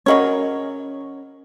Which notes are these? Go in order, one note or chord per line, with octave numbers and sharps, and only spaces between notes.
C#3 F#3 C#4 A#4 C#5 D#5